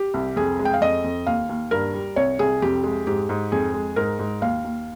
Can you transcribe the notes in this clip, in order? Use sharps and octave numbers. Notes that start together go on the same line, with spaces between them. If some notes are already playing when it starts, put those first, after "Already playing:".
Already playing: G4
C2
F2 G#4
G#3
G5
F5
F2 D#5
F2
D#2 F5
D#2
G2 A#4
G3
C2 C#5
C2 G#4
F2 G4
G#3
G#2 G4
G#2
F2 G#4
G#3
G#2 A#4
G#2
D#2 F5
D#2